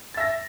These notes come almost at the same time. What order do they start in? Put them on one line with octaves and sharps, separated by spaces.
A6 E5 A#6